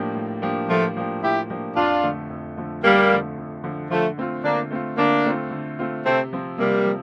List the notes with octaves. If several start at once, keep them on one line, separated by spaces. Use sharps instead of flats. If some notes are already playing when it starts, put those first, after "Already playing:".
Already playing: A2 F3 A#3 D4 G4
A2
F3 A#3 D4 G4
A2 F3 A3
F3 A#3 D4 G4
A2 E4 G4
F3 A#3 D4 G4
F2 D4 F4
D3 F3 A3
F2
D3 F3 A3
F2 G3 A#3
D3 F3 A3
F2
D3 F3 A3
D3 F3 A3
A3 C4 F4
D3 A#3 D4
A3 C4 F4
D3 A#3 D4
A3 C4 F4
D3
A3 C4 F4
C3 A3 C4
F3 C4
C3 G3 A#3
F3